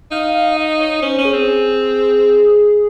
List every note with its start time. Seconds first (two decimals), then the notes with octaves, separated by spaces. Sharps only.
0.11 D#4 F5
0.34 F5
0.57 D#5
0.80 C#5
1.02 C#4 C5
1.18 C#4
1.25 G#4
1.33 C4
1.48 G#4